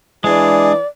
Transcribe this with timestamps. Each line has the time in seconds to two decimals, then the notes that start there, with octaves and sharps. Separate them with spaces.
0.24 E3 G#3 D4 G#4 D5